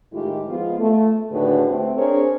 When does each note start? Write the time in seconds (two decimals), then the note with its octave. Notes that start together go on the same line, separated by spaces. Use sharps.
0.13 A2 D#3 G#3 E4 F4 G4
0.48 F3 G#3 B3 F4
0.79 A3
1.31 D#2 A2 D3 F#4 G#4 B4
1.65 A3 C4
1.96 C4 D4 G#4 A#4 C5 C#5